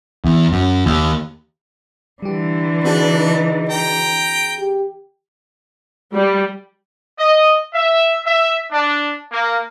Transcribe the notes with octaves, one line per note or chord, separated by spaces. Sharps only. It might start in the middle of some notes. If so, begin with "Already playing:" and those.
E2
F#2
D#2
D3 E3 G3 G4
C4 D4 D#4 F#4 G#4
G5 A#5
G4
G3
D#5
E5
E5
D4
A#3